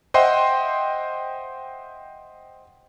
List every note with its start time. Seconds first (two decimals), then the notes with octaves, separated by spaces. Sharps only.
0.14 C5 D#5 E5 F#5 G5 C6